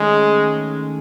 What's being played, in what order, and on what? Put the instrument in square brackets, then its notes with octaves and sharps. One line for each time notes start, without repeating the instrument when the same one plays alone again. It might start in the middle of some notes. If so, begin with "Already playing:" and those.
Already playing: [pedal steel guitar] D#3 A3 C#4 G#4 [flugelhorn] G#3